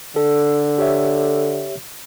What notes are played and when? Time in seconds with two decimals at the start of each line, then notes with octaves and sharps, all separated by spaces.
0.16 D3 A4
0.78 G4 C#5 E5